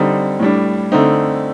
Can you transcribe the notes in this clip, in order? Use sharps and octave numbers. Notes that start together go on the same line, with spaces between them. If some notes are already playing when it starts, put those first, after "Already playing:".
Already playing: D3 G3 C4 D#4
A2 G3 D4
D3 A3 C4 D#4